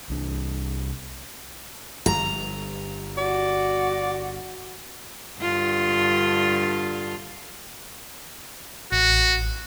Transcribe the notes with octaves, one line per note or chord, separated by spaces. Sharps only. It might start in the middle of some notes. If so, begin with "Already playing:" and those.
C2 D4
G1 A#5
F#4 D5
G2 D3 F4
A1 F#4